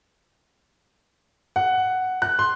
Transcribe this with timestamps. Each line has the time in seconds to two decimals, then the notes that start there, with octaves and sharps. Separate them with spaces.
1.56 F#5
2.22 F#6
2.39 C6